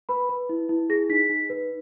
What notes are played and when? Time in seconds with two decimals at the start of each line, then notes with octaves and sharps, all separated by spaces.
0.09 B4 B5
0.29 B4
0.49 E4
0.69 E4
0.89 G#4 A#6
1.09 D#4 B6
1.30 D#4
1.50 B4